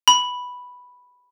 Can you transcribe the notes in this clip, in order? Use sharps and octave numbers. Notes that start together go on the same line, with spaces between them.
B5